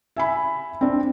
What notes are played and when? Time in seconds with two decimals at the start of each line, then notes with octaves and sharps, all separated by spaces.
0.16 E5 G#5 B5
0.81 C4 D4